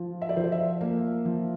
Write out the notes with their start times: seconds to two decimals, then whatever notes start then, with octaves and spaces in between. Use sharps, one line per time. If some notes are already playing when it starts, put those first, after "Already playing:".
Already playing: F3
0.22 E5
0.29 D5
0.36 F3 C5
0.44 D5
0.52 E5
0.81 A#3
1.25 F3